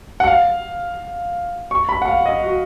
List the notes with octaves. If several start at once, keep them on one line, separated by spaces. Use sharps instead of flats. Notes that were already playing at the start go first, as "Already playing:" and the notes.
F#5
F5
C#6
B5
F#5
F5
D#5
F#4